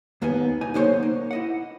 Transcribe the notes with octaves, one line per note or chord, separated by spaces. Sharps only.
D#2 A#3 B3 D#4 G#5
C2 D#4 G#5
B1 D3 A#3 D#4 C5 C#5
A#3
E4 D#5 F#5